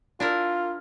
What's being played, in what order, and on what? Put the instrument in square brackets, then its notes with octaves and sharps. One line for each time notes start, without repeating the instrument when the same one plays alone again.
[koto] D4 E4 A#4 [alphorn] F4